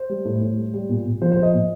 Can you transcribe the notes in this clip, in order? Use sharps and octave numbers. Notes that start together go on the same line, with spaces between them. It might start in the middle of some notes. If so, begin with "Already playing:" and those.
Already playing: C5
G3
A2
A2
G3
G3
A#2
A#2
F3 C5
C5
F3
D#5
A#2